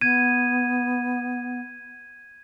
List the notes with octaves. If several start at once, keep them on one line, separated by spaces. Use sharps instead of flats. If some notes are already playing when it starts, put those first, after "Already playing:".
B3 G#6 D#7